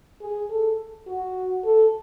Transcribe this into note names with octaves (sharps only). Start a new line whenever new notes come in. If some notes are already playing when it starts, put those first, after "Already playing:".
G#4
A4
F#4
A4